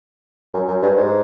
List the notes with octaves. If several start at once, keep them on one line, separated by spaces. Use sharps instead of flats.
F#2
F#2
G2
G#2